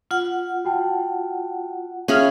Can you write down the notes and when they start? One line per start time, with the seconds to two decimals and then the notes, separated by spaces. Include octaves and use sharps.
0.11 F4 F#5 F6
0.65 F#4 G5 A5
2.08 C#4 G#4 E5 F5 B5 F6